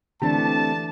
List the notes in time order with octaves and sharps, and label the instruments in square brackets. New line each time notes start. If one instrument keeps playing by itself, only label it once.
[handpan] D3 E3 D4 [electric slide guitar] A3 C4 G4 [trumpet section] A5